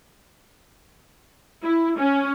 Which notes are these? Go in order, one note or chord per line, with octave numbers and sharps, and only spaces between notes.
E4
C#4